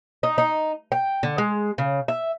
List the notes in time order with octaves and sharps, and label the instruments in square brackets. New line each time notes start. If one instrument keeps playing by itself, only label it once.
[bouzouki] D#4
D#4
G5
D3
G#3
C#3
E5